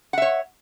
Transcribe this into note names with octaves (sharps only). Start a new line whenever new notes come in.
C#5 E5 F#5